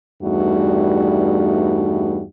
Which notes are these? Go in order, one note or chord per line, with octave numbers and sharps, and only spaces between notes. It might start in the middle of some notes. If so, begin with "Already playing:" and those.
E2 G2 G3 A3 D#4 F#4